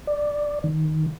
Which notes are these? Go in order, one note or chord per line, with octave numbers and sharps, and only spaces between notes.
D5
D#3